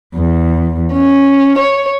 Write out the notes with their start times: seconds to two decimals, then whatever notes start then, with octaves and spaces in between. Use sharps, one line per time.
0.16 E2
0.93 C#4
1.58 C#5